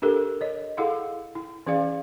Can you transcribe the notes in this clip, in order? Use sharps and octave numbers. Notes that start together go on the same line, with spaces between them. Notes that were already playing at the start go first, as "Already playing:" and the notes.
D4 G4 A4 A#4
C#5 D#5
E4 G#4 A4 F5 F#5 C6
E4
E3 C#4 G#4 D5 F5